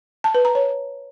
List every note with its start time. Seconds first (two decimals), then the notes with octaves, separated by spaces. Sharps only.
0.24 A5
0.35 B4
0.45 A#5
0.55 C#5